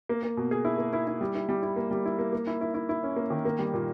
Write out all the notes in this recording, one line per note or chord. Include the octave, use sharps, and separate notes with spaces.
A#3
A#3
B2
G#4
E4
A#3
E4
E4
G3
E4
G3
E4
A#3
G3
E4
A#3
A#3
E4
E4
E4
E4
C#4
A#3
D#3
A#3
G3
A#2